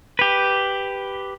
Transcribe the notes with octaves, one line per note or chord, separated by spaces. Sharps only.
G4 B4